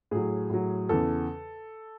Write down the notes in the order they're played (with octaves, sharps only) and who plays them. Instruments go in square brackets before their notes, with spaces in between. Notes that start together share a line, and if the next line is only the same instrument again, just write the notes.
[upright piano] A2 F#3 G#4
A2 F#3
E2 C#3 E3 A4